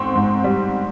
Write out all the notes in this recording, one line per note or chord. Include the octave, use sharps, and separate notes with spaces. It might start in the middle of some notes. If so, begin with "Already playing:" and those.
Already playing: G#2 C4 C6 C#6
G#2
G3